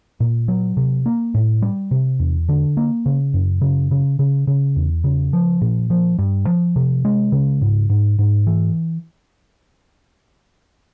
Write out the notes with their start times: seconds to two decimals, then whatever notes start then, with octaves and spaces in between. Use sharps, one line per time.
0.20 A#2
0.48 F#3
0.77 C3
1.06 A#3
1.34 A2
1.62 G3
1.91 C3
2.19 E2
2.49 D3
2.77 A#3
3.06 C#3
3.34 F#2
3.61 C#3
3.91 C#3
4.19 C#3
4.47 C#3
4.76 E2
5.04 C#3
5.33 F3
5.61 A#2
5.90 F3
6.19 G2
6.47 F3
6.76 C3
7.05 G#3
7.32 C#3
7.62 G#2
7.90 G#2
8.19 G#2
8.47 E3